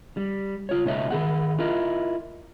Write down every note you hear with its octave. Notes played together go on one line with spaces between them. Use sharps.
G3
F4 C#5
C#2 B2 D#4 C#5 E5
D#3 G#4 F#5
E4 F4 A#4 D#5 F5